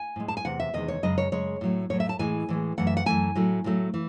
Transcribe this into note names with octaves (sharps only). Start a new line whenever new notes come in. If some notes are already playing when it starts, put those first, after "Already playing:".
Already playing: G#5
A2 G#3
A5
G#5
E2 C3 F#5
E5
E2 C3 D#3 G#3 D#5
C#5
F#2 C#3 G#3 D#5
C#5
F#2 C#3 G#3 C#5
A2 F#3 A3
A2 F#3 A3 C#5
E5
A5
A2 E3 G#3 G#5
A2 E3 G#3
F#2 E3 A3 F#5
E5
F#5
F#2 E3 A3 G#5
A2 F#3 A3
A2 F#3 A3
E3